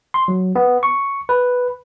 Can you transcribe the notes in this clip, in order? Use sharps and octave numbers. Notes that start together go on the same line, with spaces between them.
C6
F#3
B3
C#6
B4